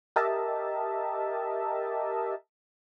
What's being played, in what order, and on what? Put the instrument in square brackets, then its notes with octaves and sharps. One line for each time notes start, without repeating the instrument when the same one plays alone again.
[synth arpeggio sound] G4 A#4 D#5 E5 A5